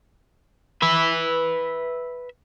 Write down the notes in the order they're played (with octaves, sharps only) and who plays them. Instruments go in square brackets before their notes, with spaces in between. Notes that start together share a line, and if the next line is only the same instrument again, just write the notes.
[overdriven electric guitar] B4 E5